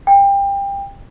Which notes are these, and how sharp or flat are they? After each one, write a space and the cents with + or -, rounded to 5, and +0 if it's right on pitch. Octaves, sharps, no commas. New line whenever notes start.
G5 +25